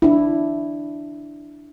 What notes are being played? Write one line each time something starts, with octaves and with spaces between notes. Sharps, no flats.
D4 E4